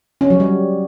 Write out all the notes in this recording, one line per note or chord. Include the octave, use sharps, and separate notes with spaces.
C#4
F#3
G3